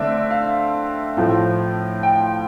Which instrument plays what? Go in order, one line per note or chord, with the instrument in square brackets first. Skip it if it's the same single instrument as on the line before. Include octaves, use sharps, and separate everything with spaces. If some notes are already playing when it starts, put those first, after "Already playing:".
Already playing: [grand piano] D3 A3 C4 D5 E5
F5
A2 F3 A3 C4
G5